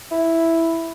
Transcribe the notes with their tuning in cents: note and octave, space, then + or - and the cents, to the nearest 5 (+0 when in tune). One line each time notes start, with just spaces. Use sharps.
E4 +0